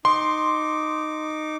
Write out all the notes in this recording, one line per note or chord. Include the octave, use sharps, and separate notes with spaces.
D#4 C6 D6